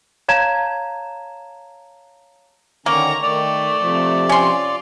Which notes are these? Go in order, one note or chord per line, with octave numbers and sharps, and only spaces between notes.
C#5 F5 A5 A#5 G#6 E7
D3 D#3 A#3 C#4 A#5 C#6
D#3 A3 D5
C3 F3
C#4 F4 C6